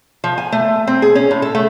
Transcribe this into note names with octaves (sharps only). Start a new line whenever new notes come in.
F3
G#5
A3
C4
G#4
C#4
A2
A4
A3